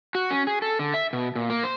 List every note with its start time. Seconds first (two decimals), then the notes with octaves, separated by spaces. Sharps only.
0.15 F#4
0.31 C#4
0.47 G#4
0.62 A4
0.79 D3
0.94 E5
1.13 B2
1.36 A#2
1.50 A#3
1.64 C5